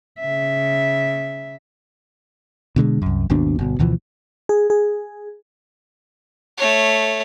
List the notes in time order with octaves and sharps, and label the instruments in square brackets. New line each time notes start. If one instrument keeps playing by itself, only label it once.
[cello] C#3 E5
[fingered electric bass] B2 D3 G3 G#3
C2 F#2
G#1 D#2 B2 D4
G1 B2
D2 B2 E3 F3
[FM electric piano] G#4
G#4
[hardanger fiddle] A3 C#5